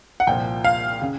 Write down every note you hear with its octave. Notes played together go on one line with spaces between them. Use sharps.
F#5
C2 A#2 F3 G5
F5
C#3